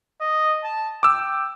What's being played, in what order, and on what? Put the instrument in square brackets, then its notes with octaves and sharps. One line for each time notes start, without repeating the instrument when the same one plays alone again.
[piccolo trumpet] D#5
A5
[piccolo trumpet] G5 [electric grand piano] D6 E6